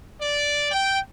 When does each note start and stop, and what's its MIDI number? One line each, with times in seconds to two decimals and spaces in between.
0.19 0.68 74
0.71 0.97 79